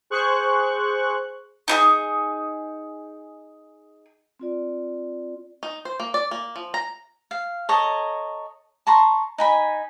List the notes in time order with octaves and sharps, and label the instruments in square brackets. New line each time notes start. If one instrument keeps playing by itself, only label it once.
[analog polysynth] G#4 C5 C#6 F#6
[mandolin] D#4 E4 G#4
[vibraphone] C4 F4 D5
[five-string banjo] D#4
C5
A#3
D5
A#3
F3
A#5
[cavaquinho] F5
A4 C#5 D#5 A#5
A5 A#5 C6 C#6
D#4 G#5 B5